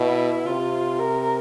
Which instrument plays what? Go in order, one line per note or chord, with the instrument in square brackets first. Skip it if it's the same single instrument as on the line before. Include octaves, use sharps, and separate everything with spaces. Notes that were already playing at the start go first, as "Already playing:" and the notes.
Already playing: [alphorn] B2 [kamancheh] E4
[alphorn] C3 [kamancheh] F4
[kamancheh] A#4